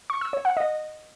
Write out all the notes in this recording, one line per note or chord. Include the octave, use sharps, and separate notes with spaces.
C#6
E6
C#5
F#5
D#5